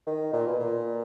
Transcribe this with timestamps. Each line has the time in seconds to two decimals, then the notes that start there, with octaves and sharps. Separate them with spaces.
0.07 D#3
0.33 A#2
0.47 B2
0.60 A#2